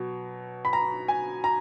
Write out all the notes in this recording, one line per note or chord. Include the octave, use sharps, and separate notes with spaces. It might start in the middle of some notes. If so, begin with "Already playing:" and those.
Already playing: B2 F#3
B5
A#5
G#5
A#5